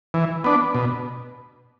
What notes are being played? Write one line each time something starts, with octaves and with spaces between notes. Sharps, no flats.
E3
B3 D4
B2